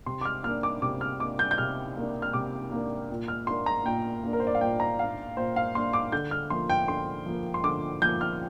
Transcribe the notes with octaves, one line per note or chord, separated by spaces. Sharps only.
C3 C6
D6
F6
A#3 D4 F6
D6
C3 D6
F6
A#3 D4 D6
G6
G6
C3 F6
A#3 D4
F6
C3 D6
A#3 D4
A#2
F6
A#3 D4 C6
A#5
A#2 G5
A#3 D4
A#4
C5
D5
F5
A#2 G5
A#5
A#3 D4 F5
A#2 C5
F5
A#3 D4 C6
D6
D3 G6
F6
F3 A#3 C6
G5
D3 C6
F3 A#3
C6
D3 D6
F3 A#3 G6
F6